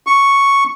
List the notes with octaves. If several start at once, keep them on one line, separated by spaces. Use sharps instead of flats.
C#6